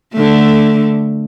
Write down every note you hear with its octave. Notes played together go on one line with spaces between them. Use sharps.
D3 A3